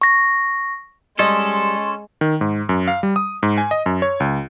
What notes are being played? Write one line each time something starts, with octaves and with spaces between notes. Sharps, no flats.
C#6 A#6
G3 G#3 C#4 A4 D#5 C6
D#3
G#2
F#2
F5
G3
D#6
G#2
G#5
D#5
F#2
C#5
C#2